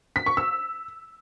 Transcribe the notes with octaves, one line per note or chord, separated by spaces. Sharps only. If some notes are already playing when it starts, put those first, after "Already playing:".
B6
C#6
E6